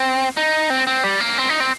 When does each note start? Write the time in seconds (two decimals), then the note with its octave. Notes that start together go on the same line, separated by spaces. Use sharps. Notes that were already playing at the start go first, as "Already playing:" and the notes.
Already playing: C4
0.37 D#4
0.70 C4
0.87 C4
1.04 G3
1.20 A#3
1.38 C4
1.49 D#4
1.60 C4